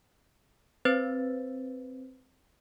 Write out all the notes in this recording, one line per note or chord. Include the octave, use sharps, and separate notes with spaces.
C4 B4 C5 A6